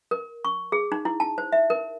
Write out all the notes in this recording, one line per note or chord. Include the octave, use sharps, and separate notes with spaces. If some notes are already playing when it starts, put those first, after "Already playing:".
A#4
C#6
G#4
D#4
E4
A5
C5
E5
A#4